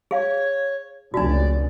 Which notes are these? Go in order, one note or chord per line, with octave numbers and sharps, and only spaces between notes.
G#4 C#5 F5
F1 C#2 D4 F#4 D5